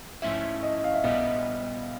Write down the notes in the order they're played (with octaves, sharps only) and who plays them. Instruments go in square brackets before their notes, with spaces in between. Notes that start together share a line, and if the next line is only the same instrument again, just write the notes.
[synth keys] G#2 F3 A3 C#4 E4 [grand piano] E5
[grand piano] D#5
F5
E5
[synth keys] A#1 A#2 G3 B3 [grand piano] D#5